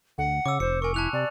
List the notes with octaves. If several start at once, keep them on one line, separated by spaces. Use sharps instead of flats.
D2 F#5
C#3 D6 E6
F1 C5 C#7
A#4 G#5 C#6
E4 A5 F#6 F7
C3 D5